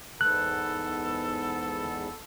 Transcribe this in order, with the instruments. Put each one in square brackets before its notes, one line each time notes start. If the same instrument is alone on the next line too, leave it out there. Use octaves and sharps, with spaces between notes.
[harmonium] E2 G#2 B3 [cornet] A4 [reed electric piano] F#6